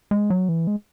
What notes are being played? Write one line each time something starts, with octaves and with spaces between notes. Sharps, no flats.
G#3
F#3
E3
G#3